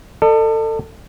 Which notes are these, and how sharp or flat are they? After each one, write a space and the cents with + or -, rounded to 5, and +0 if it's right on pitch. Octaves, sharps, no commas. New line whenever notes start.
A4 +25 D#5 -45